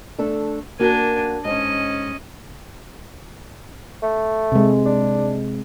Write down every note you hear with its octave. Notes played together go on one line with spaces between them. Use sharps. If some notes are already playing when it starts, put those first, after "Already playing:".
A3 D4 A4
A#3 D4 F#4 A#4 G#5
G#2 C#4 D#5
A3
C3 G#3
D4